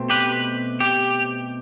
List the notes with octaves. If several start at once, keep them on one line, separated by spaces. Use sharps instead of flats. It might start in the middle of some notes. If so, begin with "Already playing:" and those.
Already playing: B2 A3 C4
G4 B4
G4